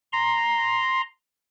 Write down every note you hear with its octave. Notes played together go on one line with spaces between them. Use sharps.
A#5 C6